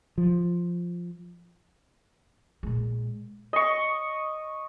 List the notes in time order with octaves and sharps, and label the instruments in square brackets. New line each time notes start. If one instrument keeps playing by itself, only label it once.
[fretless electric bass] F3
[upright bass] A#2 G#3
[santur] D#5 C#6